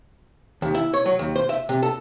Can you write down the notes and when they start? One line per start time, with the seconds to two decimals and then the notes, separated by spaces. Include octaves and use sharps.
0.62 D#2
0.75 E4
0.93 C#5
1.06 F#3
1.19 D#2
1.36 C5
1.49 E5
1.69 C3
1.83 A4